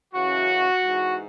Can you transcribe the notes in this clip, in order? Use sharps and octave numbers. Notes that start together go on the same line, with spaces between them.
F#2 C#3 E3 F#4
G#2 E3